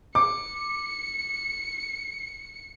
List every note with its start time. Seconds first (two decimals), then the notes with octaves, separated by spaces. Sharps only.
0.15 D6 C#7